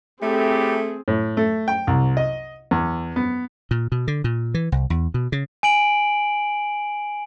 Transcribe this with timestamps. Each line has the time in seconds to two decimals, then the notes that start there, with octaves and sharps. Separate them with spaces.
0.22 A2 A3 C4 G4 G#4
1.08 A2
1.37 A3
1.68 G5
1.87 C2
2.17 D#5
2.71 E2
3.16 B3
3.71 A#2
3.92 B2
4.08 D3
4.24 A#2
4.54 E3
4.72 C2
4.90 E2
5.14 B2
5.32 C#3
5.63 G#5 D7 F#7